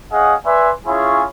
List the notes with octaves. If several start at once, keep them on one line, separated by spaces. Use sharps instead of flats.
C#4 G#4 D#5 F5 F#5
B4 D5 E5 G#5 C6
C#4 E4 F4 G#4 C#5